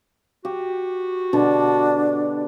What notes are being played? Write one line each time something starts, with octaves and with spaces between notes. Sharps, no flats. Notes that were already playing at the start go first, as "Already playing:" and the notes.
F#4 G4
B2 D3 D4 A5